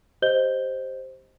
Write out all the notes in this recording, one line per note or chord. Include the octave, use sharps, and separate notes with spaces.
G4 C5 D#5 G6 G7